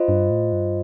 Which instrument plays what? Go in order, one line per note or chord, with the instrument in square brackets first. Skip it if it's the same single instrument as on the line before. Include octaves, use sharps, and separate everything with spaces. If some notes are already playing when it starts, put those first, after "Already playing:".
Already playing: [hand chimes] F4 C5 D#5
[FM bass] G2
A2
G2